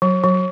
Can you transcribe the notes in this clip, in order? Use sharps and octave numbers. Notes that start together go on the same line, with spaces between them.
F#3
F#3